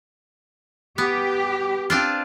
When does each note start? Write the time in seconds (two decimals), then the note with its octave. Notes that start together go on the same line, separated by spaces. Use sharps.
0.98 B3 G4
1.90 C4 D4 F4